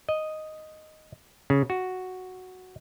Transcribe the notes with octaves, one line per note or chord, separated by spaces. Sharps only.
D#5
C#3
F#4